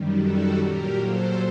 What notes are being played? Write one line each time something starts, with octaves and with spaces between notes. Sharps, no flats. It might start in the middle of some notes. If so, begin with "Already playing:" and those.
Already playing: F#2 D#3 G3
F#4 A4
A#2 F#3 G4 A#4
A4 C5